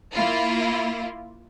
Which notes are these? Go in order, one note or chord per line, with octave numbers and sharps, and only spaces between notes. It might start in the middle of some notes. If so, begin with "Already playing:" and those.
A#3 E4 F4